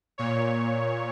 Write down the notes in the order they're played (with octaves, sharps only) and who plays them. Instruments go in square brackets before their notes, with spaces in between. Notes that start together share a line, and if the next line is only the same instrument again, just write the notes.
[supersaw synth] A#2 C#5